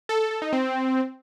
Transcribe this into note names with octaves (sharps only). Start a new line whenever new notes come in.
A4
A4
A4
D#4
C4